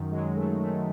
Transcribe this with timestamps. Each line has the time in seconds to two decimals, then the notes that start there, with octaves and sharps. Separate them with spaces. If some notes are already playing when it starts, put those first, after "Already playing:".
Already playing: F#2 D#3
0.10 F#3 G#3
0.35 F#2 A3
0.59 D#3 A3